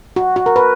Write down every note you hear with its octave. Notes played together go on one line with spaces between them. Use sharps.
F#4
F#4
A#4
B4